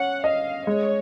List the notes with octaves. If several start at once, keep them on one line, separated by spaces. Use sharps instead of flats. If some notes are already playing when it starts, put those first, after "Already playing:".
Already playing: C#4 F#5
D#5 F5
G#3 C#5